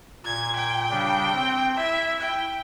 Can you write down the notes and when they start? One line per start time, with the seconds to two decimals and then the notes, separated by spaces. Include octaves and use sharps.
0.25 A#2 G#6
0.56 G5
0.90 C#3 G3 D4
1.33 C4
1.76 E4 E5
2.20 G5